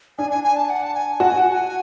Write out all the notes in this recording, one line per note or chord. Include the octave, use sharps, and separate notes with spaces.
D4 G#5
G#5
G#5
A5
F#5
A5
G#5
F#4 A5
G#5
F#5
A5
G#5